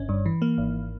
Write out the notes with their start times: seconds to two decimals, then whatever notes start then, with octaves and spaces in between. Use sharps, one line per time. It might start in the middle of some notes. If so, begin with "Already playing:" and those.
Already playing: G1 C#4
0.09 G2
0.26 E3
0.42 A#3
0.58 G#1